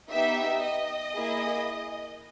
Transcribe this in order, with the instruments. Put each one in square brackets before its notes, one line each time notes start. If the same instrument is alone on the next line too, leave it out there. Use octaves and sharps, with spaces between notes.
[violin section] B3 D#4 G4 E5
D#5
A#3 E4 G#4